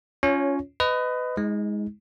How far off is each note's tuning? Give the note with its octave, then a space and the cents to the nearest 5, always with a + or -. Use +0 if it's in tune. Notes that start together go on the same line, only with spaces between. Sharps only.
C#4 +15 F4 +0 C#5 +0
B4 +25 D#5 +0
G#3 +0 D#4 +40